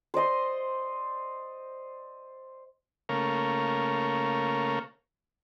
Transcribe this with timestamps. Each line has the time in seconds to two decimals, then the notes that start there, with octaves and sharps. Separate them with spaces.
0.14 C5 D5 D#5 C6
3.09 C#3 A3 A#3 A#4 C#5 F5